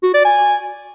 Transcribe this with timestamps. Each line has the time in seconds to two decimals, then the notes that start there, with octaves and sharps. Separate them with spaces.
0.03 F#4
0.14 D5
0.25 G#5